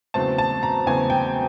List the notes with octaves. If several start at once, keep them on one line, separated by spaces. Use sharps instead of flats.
E2 C#3 F#3 A3 C4 A5
A5
A#5
E2 C#3 F#3 A3 C4 G#5
G5